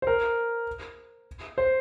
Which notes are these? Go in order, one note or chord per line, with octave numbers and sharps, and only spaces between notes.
C5
A#4
C5